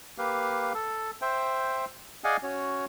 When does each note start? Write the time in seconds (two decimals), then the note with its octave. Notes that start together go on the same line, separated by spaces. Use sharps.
0.18 A#3 G4 B4 F5
0.74 A4
1.22 C5 E5 G5
2.24 G#4 D5 D#5 F5 F#5 G#5
2.43 C#4 F#4 C#5